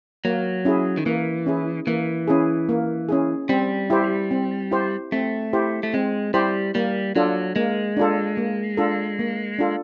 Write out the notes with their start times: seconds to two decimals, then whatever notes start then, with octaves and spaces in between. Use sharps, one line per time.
0.25 F#3 A#3
0.65 C#4 E4 G#4
0.97 D#3
1.06 E3 A#3
1.46 C#4 E4 G#4
1.87 E3 A#3
2.28 C#4 E4 G#4
2.69 A#3
3.09 C#4 E4 G#4
3.49 G3 C4
3.90 E4 G4 C5
4.31 C4
4.71 E4 G4 C5
5.12 A3 C4
5.53 E4 G4 C5
5.83 A3
5.94 G#3 C4
6.34 G3 E4 G4 C5
6.75 G3 A#3
7.16 F#3 D4 F4 A4
7.56 G#3 A#3
7.97 D4 F4 A4
8.37 A#3
8.77 D4 F4 A4
9.19 A#3
9.59 D4 F4 A4